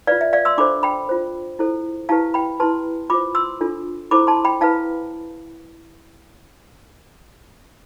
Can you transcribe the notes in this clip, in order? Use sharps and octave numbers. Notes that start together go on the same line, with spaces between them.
F4 B4 D5 F5
E5
D5 F5
C6 E6
D4 A4 C5 B5 D6
G5 B5
F4 C5
E4 A4 C5
E4 G4 B4 F5 A5
G5 B5
E4 G4 B4 A5 C6
F4 C5 B5 D6
C6 E6
D4 F4 A4
E4 A4 C5 B5 D6
A5 C6
G5 B5
E4 B4 F5 A5